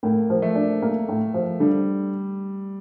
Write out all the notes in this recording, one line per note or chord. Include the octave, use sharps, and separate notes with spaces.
A2 A#3
F3
A3
D4
A#3
A2
F3
D3 G3